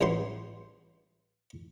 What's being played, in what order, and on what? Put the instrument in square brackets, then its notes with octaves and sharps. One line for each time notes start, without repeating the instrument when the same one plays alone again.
[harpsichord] A1 G2 F#3 C5 C6